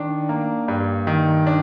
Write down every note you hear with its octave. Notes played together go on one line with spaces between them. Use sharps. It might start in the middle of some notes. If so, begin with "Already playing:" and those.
Already playing: D#3 D4
A#3
G2
D#3
D4